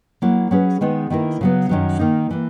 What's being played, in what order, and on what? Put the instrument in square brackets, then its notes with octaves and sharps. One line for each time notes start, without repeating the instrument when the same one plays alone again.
[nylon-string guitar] F#3 A#3 E4
F#3 C#4 G#4 B4
D#3 G#3 B3 D#4
D#3 A#3 E4 A#4
C#3 F#3 B3
F#2 D#3 F#3
D#3 A#3 D#4
E3 A#3